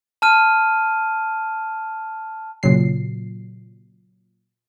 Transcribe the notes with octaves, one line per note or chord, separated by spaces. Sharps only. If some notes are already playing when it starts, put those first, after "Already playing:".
A5 F6 D#7
A#2 C#3 F#3 C7